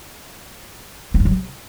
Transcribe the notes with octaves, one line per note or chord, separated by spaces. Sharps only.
B3
G2
F#3
C3